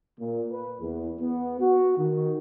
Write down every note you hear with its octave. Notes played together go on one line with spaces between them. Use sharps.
A#2
B4
E2
B3
F#4
D#3